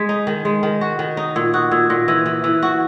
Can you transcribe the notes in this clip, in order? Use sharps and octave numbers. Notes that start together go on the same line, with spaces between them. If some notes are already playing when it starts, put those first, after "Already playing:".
Already playing: G#3 G#6 B6
D#4
D#3
G#3
D#3
F#4
D#3
D#4
A#2 E6 G#6
F#4 D#6 F#6
A#2 E6 G#6
A#2 F#6 A#6
E3 E6 G#6
E3
E3 E6
F#4 F#6
C#6 E6